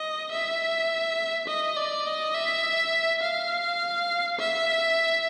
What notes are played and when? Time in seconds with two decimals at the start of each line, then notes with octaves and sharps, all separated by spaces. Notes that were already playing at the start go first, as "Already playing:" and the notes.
Already playing: D#5
0.32 E5
1.48 D#5
1.77 D5
2.06 D#5
2.35 E5
3.23 F5
4.39 E5